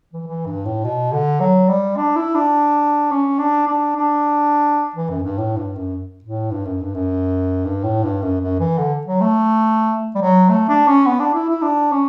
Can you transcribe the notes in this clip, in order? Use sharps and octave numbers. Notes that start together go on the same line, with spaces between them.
E3
E3
G2
A2
B2
D3
F#3
G3
D4
E4
D4
C#4
D4
D4
D4
E3
F#2
G2
A2
G2
F#2
A2
G2
F#2
G2
F#2
G2
A2
G2
F#2
F#2
E3
D3
F#3
A3
G3
F#3
A3
D4
C#4
B3
D4
E4
E4
D4
C#4